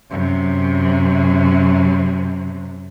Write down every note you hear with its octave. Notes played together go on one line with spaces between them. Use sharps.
F#2 C3